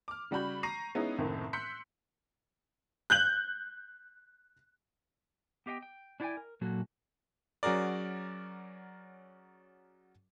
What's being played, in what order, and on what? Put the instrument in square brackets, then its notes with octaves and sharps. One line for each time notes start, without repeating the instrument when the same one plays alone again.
[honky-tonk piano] D6 F6
C#3 G3 F#4 B5 G6
A#5 C#6 A#6 C7 D#7
G#3 B3 C#4 D#4 E4
F#1 C2 A2 C3 D#3
C6 E6 F#6 G6 B6 C#7
F#6 G6 F#7
[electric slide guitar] B3 G4 D#5 F5 G5
G5
D4 E4 D5 F5 G5 G#5
A#4
A#2 F#3 A#3 F#4 A4
[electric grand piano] F#3 C#4 F#4 G#4 A#4 D5